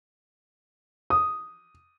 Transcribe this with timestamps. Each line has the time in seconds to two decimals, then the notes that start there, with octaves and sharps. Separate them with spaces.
1.10 D#6